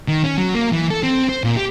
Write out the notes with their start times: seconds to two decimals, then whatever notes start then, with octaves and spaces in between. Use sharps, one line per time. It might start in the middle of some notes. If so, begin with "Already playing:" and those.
0.08 D#3
0.24 C#4
0.38 F#3
0.55 A#3
0.72 E3
0.91 A4
1.03 C4
1.29 C5
1.44 A#2
1.57 G4